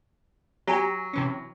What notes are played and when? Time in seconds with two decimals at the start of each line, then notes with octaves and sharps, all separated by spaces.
0.67 F#3 G4 G#5 A#5
1.13 C3 E3 C#4